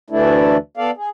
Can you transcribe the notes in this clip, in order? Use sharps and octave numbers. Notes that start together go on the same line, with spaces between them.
D2 E3 A3 D4 E4
B3 A4 D5 F5
G#4